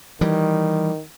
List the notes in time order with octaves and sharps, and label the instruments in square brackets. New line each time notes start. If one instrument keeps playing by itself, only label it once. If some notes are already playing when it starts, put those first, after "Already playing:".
[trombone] D#3 [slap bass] E3 G3